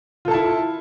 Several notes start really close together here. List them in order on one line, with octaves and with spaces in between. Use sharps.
F4 A4 A5 E4